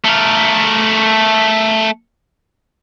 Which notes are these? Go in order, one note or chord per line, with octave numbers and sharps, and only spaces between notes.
A3 A#4